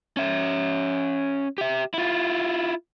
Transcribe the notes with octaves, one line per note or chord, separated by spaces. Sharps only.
C#4 E5
G4 E5
E4 F4